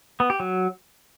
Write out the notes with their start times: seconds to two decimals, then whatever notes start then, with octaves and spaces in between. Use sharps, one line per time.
0.20 B3
0.30 G4
0.40 F#3